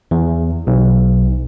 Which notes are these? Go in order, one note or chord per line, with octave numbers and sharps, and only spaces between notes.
E2
B1